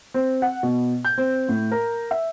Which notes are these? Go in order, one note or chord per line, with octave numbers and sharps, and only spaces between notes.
C4
F#5
B2
G6
C4
A2
A#4
E5